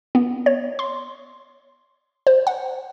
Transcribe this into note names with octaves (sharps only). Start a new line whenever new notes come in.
B3
C#5
C6
C5
F#5